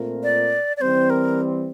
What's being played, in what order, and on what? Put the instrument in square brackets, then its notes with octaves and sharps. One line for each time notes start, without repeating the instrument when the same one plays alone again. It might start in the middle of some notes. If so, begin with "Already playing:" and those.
Already playing: [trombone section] A#2 A3 C4 F4 A#4
[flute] D5
D5
[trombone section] E3 G3 C4 [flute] C5
[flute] A#4